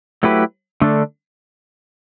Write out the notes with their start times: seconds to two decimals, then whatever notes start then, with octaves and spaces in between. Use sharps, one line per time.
0.23 F#3 A3 E4 G4 B4
0.82 D3 A3 D4